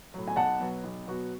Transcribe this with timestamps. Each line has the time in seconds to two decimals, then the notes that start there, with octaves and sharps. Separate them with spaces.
0.14 A2 F#3
0.28 G#5
0.36 B1 F#5 A5
0.60 B2 F#3 B3 F#4
0.84 B1
1.07 B2 F#3 B3 F#4